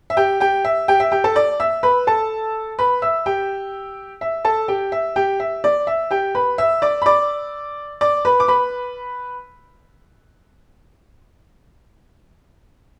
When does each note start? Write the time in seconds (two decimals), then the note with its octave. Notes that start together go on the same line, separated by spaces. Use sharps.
0.10 E5
0.17 G4 G5
0.40 G4 G5
0.65 E5
0.88 G4 G5
1.00 E5
1.12 G4 G5
1.24 A4 A5
1.36 D5 D6
1.60 E5 E6
1.83 B4 B5
2.07 A4 A5
2.79 B4 B5
3.02 E5 E6
3.26 G4 G5
4.21 E5
4.45 A4 A5
4.68 G4 G5
4.92 E5
5.16 G4 G5
5.40 E5
5.64 D5
5.87 E5
6.11 G4 G5
6.35 B4 B5
6.58 E5 E6
6.82 D5 D6
7.02 B5
7.06 D5 D6
8.01 D5 D6
8.25 B4 B5
8.40 D6
8.48 B4 B5